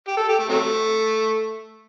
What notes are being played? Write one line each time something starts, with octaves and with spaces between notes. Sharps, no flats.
G4
A4
G4
A3
C3 F#3 A3